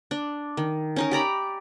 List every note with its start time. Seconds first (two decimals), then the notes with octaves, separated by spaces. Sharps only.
0.11 D4
0.57 D#3
0.96 C#4 D#4 A#4
1.11 G4 D5 A#5 B5